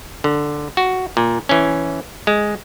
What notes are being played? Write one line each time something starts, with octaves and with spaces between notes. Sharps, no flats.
D3
F#4
A#2
E3 C#4
G#3